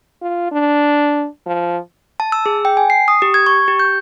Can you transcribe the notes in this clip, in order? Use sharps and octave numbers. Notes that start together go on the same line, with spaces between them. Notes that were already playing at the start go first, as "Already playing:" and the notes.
F4
D4
F3
A5
E6
G#4
G5
G#5
C7
D#6
G4
G#6
C#6
G4
G6